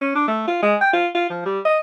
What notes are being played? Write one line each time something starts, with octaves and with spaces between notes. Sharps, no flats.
C#4
D4
A3
F4
G#3
G5
F4
F4
F3
G3
D#5